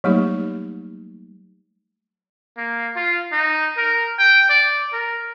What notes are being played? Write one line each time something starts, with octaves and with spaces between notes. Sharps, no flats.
F#3 G3 A3 A#3 D#4 G4
A#3
F4
D#4
A#4
G5
D5
A#4